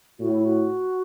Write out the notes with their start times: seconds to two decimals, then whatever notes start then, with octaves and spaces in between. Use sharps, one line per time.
0.19 A2 F#4
0.31 E4
0.43 F#4